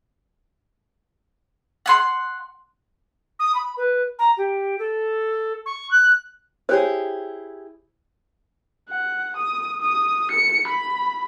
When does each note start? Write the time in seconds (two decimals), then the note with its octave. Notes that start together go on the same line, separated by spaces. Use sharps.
1.86 F#5 G#5 C6
3.39 D#6
3.55 B5
3.77 B4
4.19 A#5
4.37 G4
4.78 A4
5.66 C#6
5.91 F#6
6.69 E4 G4 G#4 C5 C#5
8.89 F#5
9.36 D#6
9.81 D#6
10.31 C#7
10.68 B5